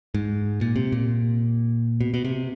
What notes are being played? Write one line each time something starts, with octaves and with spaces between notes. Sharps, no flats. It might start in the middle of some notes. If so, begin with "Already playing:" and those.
G#2
A#2
C3
A#2
B2
B2
C3